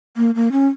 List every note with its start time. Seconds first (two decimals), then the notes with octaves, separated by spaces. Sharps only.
0.17 A#3
0.35 A#3
0.52 C#4